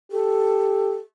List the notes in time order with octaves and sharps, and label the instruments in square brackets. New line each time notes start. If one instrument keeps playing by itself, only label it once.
[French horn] G4 [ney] A4